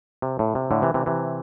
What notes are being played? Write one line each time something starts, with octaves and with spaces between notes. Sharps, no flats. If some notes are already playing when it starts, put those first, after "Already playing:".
C3
A2
C3
A2 D3
C3 E3
C3 E3
C3 E3